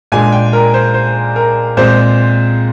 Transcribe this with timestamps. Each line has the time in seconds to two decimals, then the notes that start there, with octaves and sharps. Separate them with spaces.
0.12 A#2 G#3 D4 G#5
0.32 G5
0.53 A#4
0.74 C5
0.94 C5
1.36 A#4
1.77 A#2 G#3 C4 C5